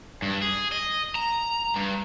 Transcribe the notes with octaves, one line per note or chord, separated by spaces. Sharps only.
G2
G#4
D#5
A#5
G2